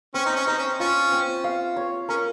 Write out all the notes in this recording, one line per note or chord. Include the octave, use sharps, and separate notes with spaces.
C4 C#4
D#4
C#4
D#4 C5
C#4
C#4 F4
C4
F5
C#5
C#4 A#4